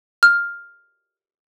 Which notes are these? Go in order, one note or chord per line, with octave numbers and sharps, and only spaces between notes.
F6